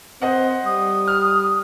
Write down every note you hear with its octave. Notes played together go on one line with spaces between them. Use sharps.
C4 C5 D#5 F#5
G3 D#6
F6